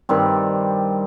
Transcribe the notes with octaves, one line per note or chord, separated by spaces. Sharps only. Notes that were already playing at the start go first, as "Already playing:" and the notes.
G2 D#3 G3 C4